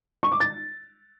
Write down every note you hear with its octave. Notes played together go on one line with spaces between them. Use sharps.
C#6
D6
A6